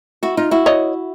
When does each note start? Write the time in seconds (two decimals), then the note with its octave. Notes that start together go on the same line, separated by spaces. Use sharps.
0.23 E4 F#4
0.37 D#4 F4
0.51 E4 F#4
0.66 C#5 D#5